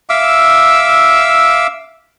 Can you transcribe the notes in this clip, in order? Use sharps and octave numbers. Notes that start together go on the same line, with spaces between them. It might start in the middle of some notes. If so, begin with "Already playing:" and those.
E5 F5 D6 E6